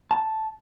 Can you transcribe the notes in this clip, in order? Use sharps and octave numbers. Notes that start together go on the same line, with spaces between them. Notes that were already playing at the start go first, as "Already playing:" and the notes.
A5